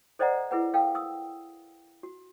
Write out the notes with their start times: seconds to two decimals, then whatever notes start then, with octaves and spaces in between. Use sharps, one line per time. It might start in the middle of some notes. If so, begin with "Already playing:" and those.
0.19 A4 C5 D5 D#5 F#5 A#5
0.51 E4 G#4 B4 F#5
0.74 A4 A#4 F5 G5
0.95 D#6 E6
2.03 F#4